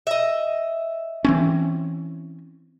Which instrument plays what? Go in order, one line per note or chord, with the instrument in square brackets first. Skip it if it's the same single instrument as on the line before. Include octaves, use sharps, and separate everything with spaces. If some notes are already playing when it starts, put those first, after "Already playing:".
[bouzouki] D#5 E5
[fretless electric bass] E3 C4 C#4